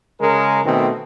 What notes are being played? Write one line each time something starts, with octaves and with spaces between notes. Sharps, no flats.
C#3 G#3 A#4
B2 D#3 A3 C4